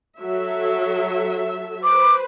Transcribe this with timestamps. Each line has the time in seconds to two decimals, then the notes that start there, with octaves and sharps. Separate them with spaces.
0.19 F#3 A4 E5
1.83 B4 C5 D6